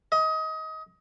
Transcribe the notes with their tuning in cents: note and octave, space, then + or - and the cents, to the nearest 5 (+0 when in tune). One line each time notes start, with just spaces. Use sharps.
D#5 +25